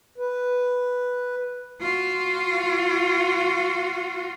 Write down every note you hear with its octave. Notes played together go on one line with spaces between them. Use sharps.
B4
F4 F#4